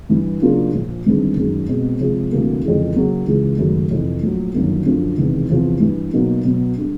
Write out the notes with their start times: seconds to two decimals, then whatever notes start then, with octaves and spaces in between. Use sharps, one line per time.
0.09 G2 E3 G3
0.42 C#3 F#3 A#3 D4 F4
0.74 A#1 A#2 F3
1.05 G1 G2 D#3 G#3 C4
1.37 F#2 D#3 G#3 C#4
1.69 B2 G#3 C4
2.00 C3 F3 G#3
2.32 D2 C3 E3 G3 A#3
2.64 F2 C#3 E3 G#3
2.96 C#3 F#3 A#3
3.27 C#2 C#3 E3
3.58 G#1 F#2 C#3 F#3 A3
3.91 F2 C3 E3
4.23 A#1 A2 F#3
4.54 G1 F#2 D#3 F#3 A#3
4.86 F#2 D3 F3
5.18 E1 E2 C3 D#3
5.50 E2 C3 F3
5.80 G2 E3 G3
6.13 B2 F#3 A#3 D#4
6.45 B2 F#3 B3
6.78 D3 G3